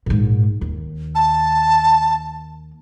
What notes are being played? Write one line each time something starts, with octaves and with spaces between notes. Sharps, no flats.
A#1 G#2
D#2
A5